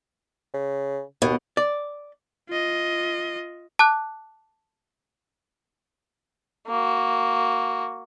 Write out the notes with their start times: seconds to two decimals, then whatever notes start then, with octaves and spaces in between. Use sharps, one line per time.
0.54 C#3
1.22 D#2 B2
1.57 D5
2.49 F4 D#5
3.79 A5 D6 F#6
6.67 A#3 F#4